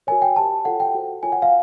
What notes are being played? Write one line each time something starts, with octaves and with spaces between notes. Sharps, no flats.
F#4 A#4 C#5 G#5
G5
G4 C5 A5
F4 A4 C#5 F#5
G5
F#4 A4 C5
F4 A#4 C#5 G#5
F#5
F5